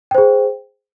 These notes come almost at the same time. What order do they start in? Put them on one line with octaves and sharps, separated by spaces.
G5 C5 G#4